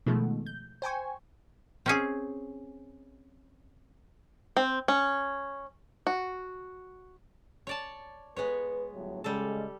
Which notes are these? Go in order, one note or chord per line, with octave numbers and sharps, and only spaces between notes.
B2 D#3 F3 G#3 A3
G6
C5 G5 G#5 C#6
C4 C#4 G#4
C4
C#4
F#4
C#5 D5 A5
G#3 B3 B4 C#5
G1 A2 F#3
C#3 G3 G#3 A4